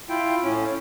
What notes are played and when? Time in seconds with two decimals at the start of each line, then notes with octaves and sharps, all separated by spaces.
0.09 E4 F4 G5
0.43 A2 C#4